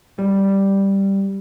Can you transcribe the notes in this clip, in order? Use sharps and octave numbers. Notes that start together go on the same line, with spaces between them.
G3